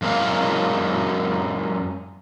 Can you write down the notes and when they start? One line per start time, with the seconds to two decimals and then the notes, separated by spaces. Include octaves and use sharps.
0.02 F#2 G#3 A#3 F5